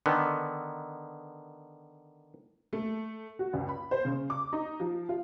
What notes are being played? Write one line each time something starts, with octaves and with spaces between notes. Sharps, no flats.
D3 D#3 B3
A3
F#4
C#2
B5
C5
C#3
D6
D#4
F3
F4